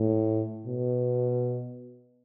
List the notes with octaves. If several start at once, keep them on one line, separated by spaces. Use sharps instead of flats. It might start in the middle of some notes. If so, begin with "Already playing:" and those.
Already playing: A2
B2